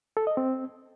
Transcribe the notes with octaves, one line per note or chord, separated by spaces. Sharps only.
A4
D#5
C4